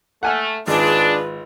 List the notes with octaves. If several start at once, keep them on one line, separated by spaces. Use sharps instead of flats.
A3 F#5 G#5 F6
G#1 D4 F4 G#4 B4